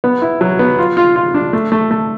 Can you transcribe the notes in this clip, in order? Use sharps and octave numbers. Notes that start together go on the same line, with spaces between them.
B3
E4
F#3
B3
F4
F4
F4
D4
A3
A3
A3